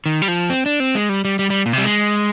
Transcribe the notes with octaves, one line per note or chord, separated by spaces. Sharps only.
D#3
G3
F3
C4
D4
C4
G#3
G3
G3
G3
G3
A#2
C3 G3
G#3